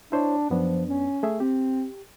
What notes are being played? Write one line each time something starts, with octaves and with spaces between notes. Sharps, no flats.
D4 E4 C5 C#5
F#2 F3 B3 D4
C#4
A3 G#4 E5
C4 G4